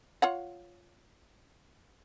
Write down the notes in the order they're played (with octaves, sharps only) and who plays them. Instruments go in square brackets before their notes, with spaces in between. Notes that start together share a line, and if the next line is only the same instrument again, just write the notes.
[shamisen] F4 C#5 F#5